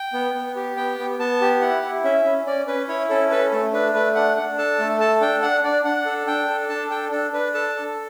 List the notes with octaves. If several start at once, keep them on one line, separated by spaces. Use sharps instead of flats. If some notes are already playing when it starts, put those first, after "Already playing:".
Already playing: G5
B3
B3
G4
B3 G5
B3
B3 A5
G4
E4 F#5
E4
C#4 E5
C#4
C#4 D5
C#4 B4
E4 C#5
C#4 A4
A4 B4
A3 A4
D4 B4
A3 B4
D4 F#5
D4
A4 A5
A3
A4 A5
D4 G5
D4 F#5
D4 D5
D4 F#5
A4
D4 G5
A4
D4 A5
A4 G5
D4 A4
D4 B4
A4 A5
A4